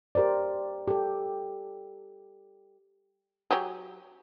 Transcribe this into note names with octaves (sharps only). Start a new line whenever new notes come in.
G4 A#4 C5 D5
G4 A4
F#3 G4 G#4